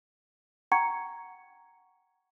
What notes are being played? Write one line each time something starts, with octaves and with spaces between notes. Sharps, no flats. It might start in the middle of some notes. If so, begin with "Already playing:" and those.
F#5 G5 A#5 C#6 G#6 C#7